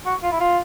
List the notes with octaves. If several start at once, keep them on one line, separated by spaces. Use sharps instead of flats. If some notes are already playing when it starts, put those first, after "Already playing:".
F#4
F4
E4
F4